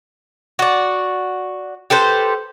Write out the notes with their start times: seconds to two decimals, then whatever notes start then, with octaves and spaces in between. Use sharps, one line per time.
0.59 F#4 D5
1.90 G4 A4 B4 C5